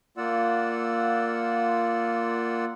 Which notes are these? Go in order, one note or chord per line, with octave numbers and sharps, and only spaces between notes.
A#3 F4 D5 F#5 E6